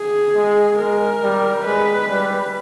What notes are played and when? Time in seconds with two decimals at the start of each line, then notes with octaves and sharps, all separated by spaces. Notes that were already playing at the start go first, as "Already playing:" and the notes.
Already playing: G#4
0.35 G#3
0.79 G#3 A#4
1.23 G3
1.65 G#3 B4
2.09 G3